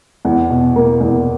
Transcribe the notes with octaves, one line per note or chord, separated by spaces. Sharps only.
E2
B2
A#3
E2